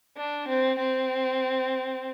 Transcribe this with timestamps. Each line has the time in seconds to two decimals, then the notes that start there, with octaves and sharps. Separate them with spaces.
0.18 D4
0.48 C4
0.79 C4